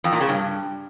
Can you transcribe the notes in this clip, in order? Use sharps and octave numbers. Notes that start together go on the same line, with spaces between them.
F2
A#2
C#3
G2